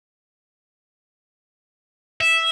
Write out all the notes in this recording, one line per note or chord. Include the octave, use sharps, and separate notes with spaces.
E5